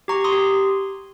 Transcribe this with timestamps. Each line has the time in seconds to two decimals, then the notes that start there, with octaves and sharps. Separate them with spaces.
0.08 G4 A#5 C#6
0.24 C6 D#6
0.33 G4